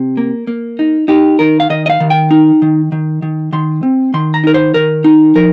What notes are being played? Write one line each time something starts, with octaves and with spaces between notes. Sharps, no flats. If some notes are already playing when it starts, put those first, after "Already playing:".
Already playing: C3
A#3
A#3
D#4
D#4 G4
D#3 A#4
F5
D#3 D#5
D#5
F5
D#3
G5
D#4
D#3
D#3
D#3
D#3 C6
C4
D#3 C6
A#5
D#4 A#4
C5
D#3 A#4
D#4
F3 A#4